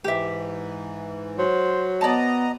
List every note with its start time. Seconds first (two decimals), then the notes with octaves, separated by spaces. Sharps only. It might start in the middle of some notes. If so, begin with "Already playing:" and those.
0.04 G#2 E3 G4 E5
1.38 F#3 C5
2.01 B3 D5 D#5 A5 A#5